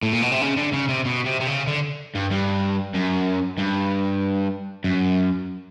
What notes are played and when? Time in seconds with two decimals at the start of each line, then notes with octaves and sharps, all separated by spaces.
0.03 A2
0.13 A#2
0.22 B2
0.32 C3
0.42 C#3
0.57 D3
0.73 C#3
0.88 C3
1.05 B2
1.25 C3
1.41 C3
1.47 C#3
1.67 D3
2.15 G2
2.31 G2
2.95 F#2
3.58 G2
4.84 F#2